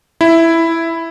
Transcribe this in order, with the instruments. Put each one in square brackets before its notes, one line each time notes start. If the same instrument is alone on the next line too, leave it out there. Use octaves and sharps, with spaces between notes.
[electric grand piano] E4